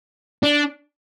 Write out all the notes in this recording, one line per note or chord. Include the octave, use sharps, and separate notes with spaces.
D4